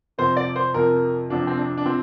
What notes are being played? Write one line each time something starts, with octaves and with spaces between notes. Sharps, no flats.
F2 C3 F3 C5
D5
C5
F2 C3 F3 A#4
F2 C3 F3 D4
C4
D4
D4
C3 F3 C4